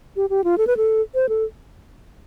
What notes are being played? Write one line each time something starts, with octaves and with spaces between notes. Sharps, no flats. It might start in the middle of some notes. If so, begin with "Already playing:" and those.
G4
G4
F4
A4
B4
A4
C5
A4